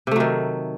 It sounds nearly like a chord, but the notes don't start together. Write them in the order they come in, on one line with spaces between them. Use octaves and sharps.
C3 A3 F#3 D#3